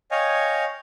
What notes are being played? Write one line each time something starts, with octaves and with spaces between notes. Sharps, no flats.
C#5 D#5 F5 G5 G#5